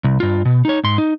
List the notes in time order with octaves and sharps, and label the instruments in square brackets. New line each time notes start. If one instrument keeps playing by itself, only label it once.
[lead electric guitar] C2
G2 F4
B2
D#4 C#5
G#2 C6
D#4